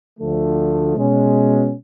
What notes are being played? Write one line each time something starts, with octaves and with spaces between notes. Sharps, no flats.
D2 D3 F3 A3
B2 G#3 C#4